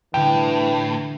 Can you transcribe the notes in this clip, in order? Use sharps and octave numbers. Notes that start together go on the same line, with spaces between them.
A2 D3 E3 G3 G5